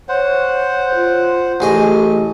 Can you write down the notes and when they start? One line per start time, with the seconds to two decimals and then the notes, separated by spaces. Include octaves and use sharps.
0.09 C5 C#5 F#5
0.95 F4
1.60 A1 A3 G#4 D#5